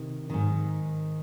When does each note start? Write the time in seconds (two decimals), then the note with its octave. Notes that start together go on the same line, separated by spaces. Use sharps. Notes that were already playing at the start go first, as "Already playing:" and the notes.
Already playing: C3 D#3
0.30 G#2 D#3